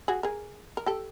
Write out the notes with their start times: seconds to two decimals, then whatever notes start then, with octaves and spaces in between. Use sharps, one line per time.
0.08 F#4 G#4
0.23 G#4 A#4
0.77 A#4
0.86 G4 A4